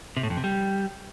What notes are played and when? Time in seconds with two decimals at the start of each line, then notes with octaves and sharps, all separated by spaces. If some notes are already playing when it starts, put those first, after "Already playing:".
0.17 C3
0.23 A2
0.30 F2
0.37 C3
0.44 G3